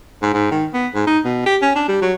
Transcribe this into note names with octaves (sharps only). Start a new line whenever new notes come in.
G#2
G#2
D#3
B3
G#2
D#4
B2
G4
C#4
D4
G3
F#3